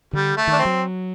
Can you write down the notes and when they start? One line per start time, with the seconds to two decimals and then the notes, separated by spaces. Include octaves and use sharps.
0.13 D3 G3
0.37 A3
0.48 D#3 D4
0.59 C4
0.65 F#3